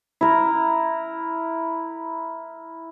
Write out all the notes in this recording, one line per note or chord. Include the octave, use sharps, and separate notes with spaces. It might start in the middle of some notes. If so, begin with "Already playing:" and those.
E4 A#4